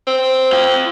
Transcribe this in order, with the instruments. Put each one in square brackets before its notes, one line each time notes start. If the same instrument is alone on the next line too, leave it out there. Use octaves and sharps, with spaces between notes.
[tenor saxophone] C4
[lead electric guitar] F4 G5